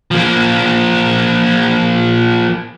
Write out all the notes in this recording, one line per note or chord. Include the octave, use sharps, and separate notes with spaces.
F3 A#3